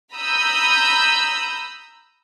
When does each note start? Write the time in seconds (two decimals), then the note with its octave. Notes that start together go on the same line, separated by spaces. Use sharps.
0.13 A#5 B5 D#6 E6 G6